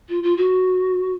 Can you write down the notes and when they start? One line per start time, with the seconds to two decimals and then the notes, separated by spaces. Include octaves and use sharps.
0.09 F4
0.23 F4
0.37 F#4